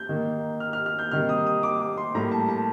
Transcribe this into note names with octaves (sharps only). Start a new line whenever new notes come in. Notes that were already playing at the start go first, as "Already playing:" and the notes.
Already playing: G6
D#3 A#3
F6
F6
F6
G6
C3 D#3 G3 A#3 F6
D#6
D#6
D6
D6
C6
A2 G3 A#3 A#5
A5
A5